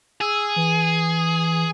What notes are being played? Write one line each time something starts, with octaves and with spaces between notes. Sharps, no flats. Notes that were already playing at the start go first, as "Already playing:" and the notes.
G#4 E6
E3